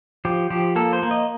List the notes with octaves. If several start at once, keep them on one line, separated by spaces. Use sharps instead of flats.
F3 G4
F3 G4
A#3 A4
C5
A#3
D#5